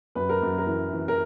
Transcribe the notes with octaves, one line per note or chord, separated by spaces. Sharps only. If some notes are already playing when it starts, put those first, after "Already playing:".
F#2 B4
A#4
F#2
A#4
E3
E3
A#4